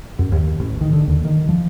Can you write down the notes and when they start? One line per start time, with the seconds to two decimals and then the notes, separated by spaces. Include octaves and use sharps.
0.19 F#2
0.32 D#2
0.60 A1
0.81 D#3
0.93 D3
1.07 D#2
1.25 D#3
1.49 F3